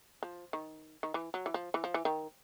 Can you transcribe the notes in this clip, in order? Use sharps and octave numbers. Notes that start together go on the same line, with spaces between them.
F3
D#3
D#3
E3
F#3
E3
F3
E3
F3
E3
D#3